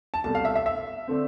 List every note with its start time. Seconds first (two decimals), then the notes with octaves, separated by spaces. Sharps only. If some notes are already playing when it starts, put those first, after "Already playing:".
0.14 A5
0.24 C2 B2 A3 A5
0.35 F5
0.45 E5
0.56 E5
0.66 E5
1.08 D3 A3 C4